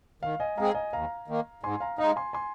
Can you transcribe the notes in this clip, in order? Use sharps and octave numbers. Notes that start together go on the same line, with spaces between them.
D#3 F5
D#5 G#5
G#3 C4 G#4 F5 A#5
D#5 G#5
D#2 F5 A#5
D#3 A#3
G#2 G#5 C6
F5 A#5
G#3 D#4 F5 A#5
G#5 C6
G#5 C6